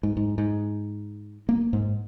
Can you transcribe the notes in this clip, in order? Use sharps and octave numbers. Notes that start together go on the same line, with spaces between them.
G#2
G#2
G#2
A#3
G#2